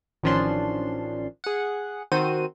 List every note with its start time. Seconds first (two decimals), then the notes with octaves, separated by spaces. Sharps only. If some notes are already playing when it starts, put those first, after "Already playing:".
0.23 A1 D#3 F3 C#4 D4 C6
1.44 G#4 F#5
2.12 D#3 C4 F#4 C5 D#7